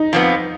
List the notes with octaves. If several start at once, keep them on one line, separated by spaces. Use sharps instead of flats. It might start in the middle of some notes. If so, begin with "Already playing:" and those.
Already playing: D#4
F2 F3 B3